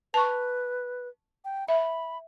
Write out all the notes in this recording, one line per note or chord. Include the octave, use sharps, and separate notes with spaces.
B4 A5 C#6
G5
E5 B5